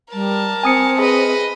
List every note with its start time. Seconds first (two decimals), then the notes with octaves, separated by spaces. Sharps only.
0.13 G3 A#4 A5
0.63 C4 G#5 D#6 C#7
0.99 G#4 B4 D#5